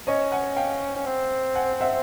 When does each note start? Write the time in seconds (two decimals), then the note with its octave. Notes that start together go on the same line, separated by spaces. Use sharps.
0.07 C#4 C#5 D#5
0.32 F#5 G#5
0.57 F5 G5
0.96 C#4
1.06 C4
1.55 F#5 G#5
1.81 E5 F#5